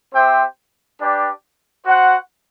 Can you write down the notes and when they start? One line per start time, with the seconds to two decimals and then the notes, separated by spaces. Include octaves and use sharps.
0.13 C4 G4 C5 E5 G5
0.99 D4 G4 B4 D5 G5
1.85 F#4 C5 F#5